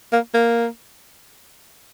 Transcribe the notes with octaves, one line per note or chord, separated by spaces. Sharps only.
A#3
A#3